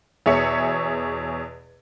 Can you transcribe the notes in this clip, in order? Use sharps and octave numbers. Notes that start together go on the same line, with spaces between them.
E2 B2 G#4 C#5 E5 C#7